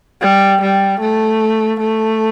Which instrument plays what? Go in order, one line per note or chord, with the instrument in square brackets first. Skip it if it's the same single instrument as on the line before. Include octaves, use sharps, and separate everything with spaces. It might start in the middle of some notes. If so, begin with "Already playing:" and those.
[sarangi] G3
G3
A3
A3